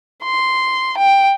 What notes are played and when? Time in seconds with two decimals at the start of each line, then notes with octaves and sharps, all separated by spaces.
0.24 C6
0.98 G5